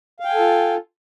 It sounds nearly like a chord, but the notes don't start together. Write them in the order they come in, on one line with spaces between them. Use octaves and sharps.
F5 G5 G#5 A4 F4